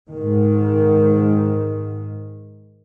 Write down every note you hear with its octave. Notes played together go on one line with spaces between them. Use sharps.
G#2 D#3